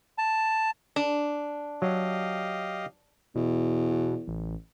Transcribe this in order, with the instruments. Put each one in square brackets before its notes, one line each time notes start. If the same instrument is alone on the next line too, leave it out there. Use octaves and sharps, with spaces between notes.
[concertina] A5
[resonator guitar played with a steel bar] D4
[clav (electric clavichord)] F#3 [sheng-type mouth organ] G4 D#5 F5
[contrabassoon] E2 [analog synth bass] B2
[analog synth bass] B2
A1